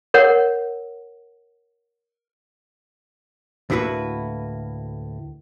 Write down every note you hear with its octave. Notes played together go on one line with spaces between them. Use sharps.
A#4 C#5 F#5
D2 A2 A#3 E4 F#4 B4